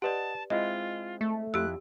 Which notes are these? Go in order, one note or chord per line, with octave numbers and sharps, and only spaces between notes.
G4 B4 D5 D#5 F#5 A5
G#3 C4 E4 F4 D#5
A3
F2 E4 G4 E6 F#6